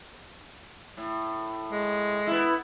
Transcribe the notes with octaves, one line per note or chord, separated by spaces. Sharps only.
A2
G#3
B3 E4